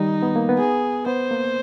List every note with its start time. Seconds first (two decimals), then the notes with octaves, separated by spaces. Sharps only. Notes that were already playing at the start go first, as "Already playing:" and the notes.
Already playing: D#3 G3 D#4
0.23 B3
0.36 A#3
0.49 B3
0.57 G#4
1.06 B3 C5
1.31 A#3